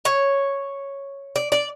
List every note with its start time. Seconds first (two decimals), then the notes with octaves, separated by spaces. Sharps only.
0.05 C#5
1.36 D5
1.52 D5